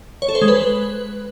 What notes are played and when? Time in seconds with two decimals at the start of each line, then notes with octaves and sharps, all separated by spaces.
0.22 C#5
0.29 A4
0.35 C5
0.42 G#3
0.48 B4